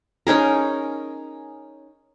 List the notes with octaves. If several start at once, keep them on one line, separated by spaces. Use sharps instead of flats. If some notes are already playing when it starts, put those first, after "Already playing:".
C#4 D#4 G#4 A#4